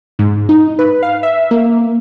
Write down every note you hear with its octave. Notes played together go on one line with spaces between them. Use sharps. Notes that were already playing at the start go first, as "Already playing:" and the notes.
G#2
D#4
B4
F5
E5
A#3